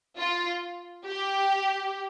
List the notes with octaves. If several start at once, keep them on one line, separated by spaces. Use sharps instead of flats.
F4
G4